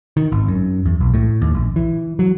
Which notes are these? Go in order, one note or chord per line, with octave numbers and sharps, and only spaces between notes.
D#3
G#1
F#2
E2
B1
A2
D#2
A#1
E3
F#3